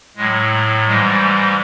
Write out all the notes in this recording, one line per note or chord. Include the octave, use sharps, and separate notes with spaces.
A2 F#3 G#3
A3
G#2 E3 G3 G#3
A3